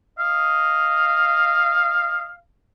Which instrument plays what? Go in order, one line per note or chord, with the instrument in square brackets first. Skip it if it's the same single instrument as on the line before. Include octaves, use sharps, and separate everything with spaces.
[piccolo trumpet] D#5 [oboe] F5